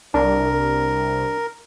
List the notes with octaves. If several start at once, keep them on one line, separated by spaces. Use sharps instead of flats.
C2 D4 A#4